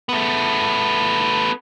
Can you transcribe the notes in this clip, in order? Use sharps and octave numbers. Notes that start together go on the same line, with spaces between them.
A3 B3